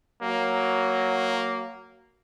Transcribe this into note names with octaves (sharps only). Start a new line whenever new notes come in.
F#3 A#3